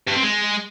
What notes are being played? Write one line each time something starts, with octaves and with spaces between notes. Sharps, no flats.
G2
C4
G#3